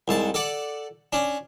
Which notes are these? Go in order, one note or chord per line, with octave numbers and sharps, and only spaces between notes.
C2 G#2 A5
A4 D5 F#5
C#4 D4